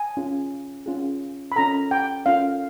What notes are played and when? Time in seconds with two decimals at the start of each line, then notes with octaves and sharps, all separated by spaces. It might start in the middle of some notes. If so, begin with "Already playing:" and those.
Already playing: G#5
0.17 C#4 F4 G#4
0.86 C#4 F4 G#4
1.52 B5
1.56 C#4 F4 A4 A#5
1.91 G5
2.26 C#4 F4 A4 F5